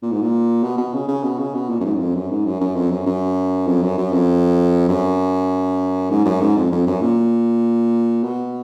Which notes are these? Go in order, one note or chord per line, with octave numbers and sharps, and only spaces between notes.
A#2
G#2
A#2
B2
B2
C#3
C#3
B2
C#3
B2
A#2
F#2
G#2
F#2
F2
F#2
G#2
F#2
F#2
F2
F#2
F#2
F2
F#2
F#2
F2
F#2
G#2
F#2
G#2
F2
F2
F#2
A#2
B2